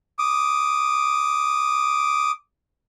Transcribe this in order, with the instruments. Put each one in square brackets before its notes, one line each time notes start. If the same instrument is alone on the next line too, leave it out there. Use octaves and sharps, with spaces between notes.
[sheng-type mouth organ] D6 D#6